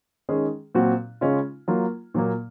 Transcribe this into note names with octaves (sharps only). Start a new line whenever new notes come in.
D#3 G#3 C#4 G#4
A#2 F#3 C4 F#4
C#3 G#3 C#4 F4
F#3 A#3 F4
A#2 F#3 A#3